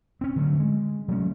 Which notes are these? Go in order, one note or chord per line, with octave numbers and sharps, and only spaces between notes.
C4 C#4
D3 F#3 G#3 A3
G#3
F#3 A3 C#4